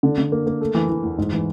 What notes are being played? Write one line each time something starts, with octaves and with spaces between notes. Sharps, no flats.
D3
D3
A#3
A#3
A3
E3
E3
E2
G#2
E3